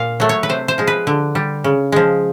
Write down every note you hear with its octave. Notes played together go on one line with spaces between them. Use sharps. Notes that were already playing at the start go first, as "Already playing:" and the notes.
Already playing: A#2 F5
F#3 A3
C#5
B4
C3 C5
C5
F3 G#3
B4
D3
G3
C#3
F3 G#3